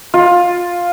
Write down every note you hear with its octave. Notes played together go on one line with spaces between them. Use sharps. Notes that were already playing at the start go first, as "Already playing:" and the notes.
F4